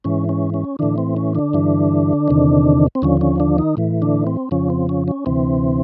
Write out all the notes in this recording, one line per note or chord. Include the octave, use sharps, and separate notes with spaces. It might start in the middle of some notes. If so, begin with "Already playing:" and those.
G#2 E3 C#4
C#4
C#4
A2 D3 E3 D4
C4
C#4
D3 D4
G2 E3
E2 C3 D#3
C4
D#2 D3 F3 C#4
C#4
D3 D4
D#3 D#4
A2 E3
D3 D4
C4
F2 C#3 F3 C#4
C4
C#4
C#4
D2 C3 E3 C4